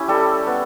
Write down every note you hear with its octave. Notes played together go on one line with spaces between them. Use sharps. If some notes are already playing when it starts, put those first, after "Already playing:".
Already playing: C#4 E4 G4
G3 A4
B3